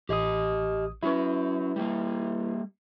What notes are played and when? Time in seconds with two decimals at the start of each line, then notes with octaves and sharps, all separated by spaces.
0.09 A1 G4 D#5 D#6
1.03 F#3 C#4 E4 B4
1.76 G3 A#3